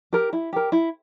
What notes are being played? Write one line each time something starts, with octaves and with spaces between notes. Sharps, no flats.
G4 A#4
E4
G4 A#4
E4